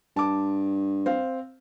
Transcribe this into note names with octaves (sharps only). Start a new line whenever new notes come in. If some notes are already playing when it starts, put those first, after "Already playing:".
G2 A5 D6
C4 F5